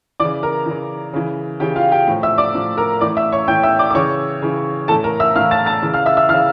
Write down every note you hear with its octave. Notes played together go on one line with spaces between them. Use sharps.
C#3 E3 D5 D6
A#4 A#5
C#3 E3
C#3 E3
C#3 E3 G4 G5
F4 F5
G4 G5
A2 F3
E5 E6
D5 D6
A2 F3
A#4 A#5
A2 E3 D5 D6
E5 E6
C#5 C#6
A2 E3 G5 G6
E5 E6
D5 D6
D6
C#3 E3 C#5 C#6
C#3 E3
A2 E3 A4 A5
A#4 A#5
E5 E6
A2 E3 F5 F6
A5 A6
A5 A6
C#3 E3
F5 F6
E5 E6
E5 E6
E3 F5 F6
C#3